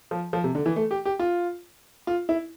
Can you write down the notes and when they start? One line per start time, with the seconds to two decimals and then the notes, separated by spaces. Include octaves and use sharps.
0.11 F3
0.33 F3
0.44 C3
0.55 D3
0.66 E3
0.76 A3
0.91 G4
1.05 G4
1.19 F4
2.07 F4
2.29 E4